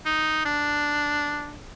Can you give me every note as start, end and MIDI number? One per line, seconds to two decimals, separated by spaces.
0.06 0.42 63
0.45 1.55 62